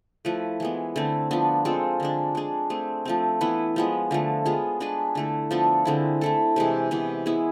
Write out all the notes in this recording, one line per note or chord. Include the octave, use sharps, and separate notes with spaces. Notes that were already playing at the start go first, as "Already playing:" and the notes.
F3 A3 E4 B4
E3 G#3 B3
D3 A3 C4 E4
F3 B3 D4
G#3 C4 F4 A4
D3 G#3 D4
G#3 D4 G#4
A3 C4 G#4
F3 A3 C4
E3 B3 E4 B4
F3 G#3 B3
D3 F3 A3
G#3 B3 F4 G#4
G#3 D4 G#4 B4
D3 A3 E4
F3 B3 D4 A4
D3 G#3 C4 E4
A3 E4 A4
C3 E3 G#3
C3 E3 B3
G#3 B3 E4 G#4